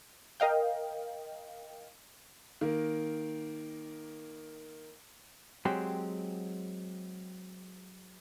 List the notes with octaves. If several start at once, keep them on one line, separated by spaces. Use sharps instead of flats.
A#4 D#5 F5 G5
D#3 A#3
F#3 G#3 C4 G4